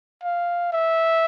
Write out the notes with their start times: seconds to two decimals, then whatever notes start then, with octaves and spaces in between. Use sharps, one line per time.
0.23 F5
0.72 E5